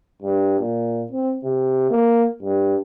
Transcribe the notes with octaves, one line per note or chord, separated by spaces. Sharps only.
G2
A#2
C4
C3
A#3
G2